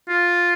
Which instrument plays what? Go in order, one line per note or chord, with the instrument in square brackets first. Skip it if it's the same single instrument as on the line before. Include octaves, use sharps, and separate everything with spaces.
[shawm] F4